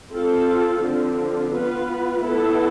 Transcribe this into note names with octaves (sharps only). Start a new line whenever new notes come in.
C4 F4 A4
D3 F3 C4
B3 F4 B4
B3 E4 A4